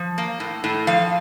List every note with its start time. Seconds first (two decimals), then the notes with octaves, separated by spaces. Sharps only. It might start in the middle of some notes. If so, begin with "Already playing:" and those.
Already playing: F3
0.18 A#3
0.40 A2
0.64 A2
0.87 F3 F5